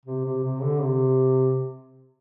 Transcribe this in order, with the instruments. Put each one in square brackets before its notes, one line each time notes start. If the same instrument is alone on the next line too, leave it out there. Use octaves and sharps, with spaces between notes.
[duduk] C3
C3
C3
D3
C3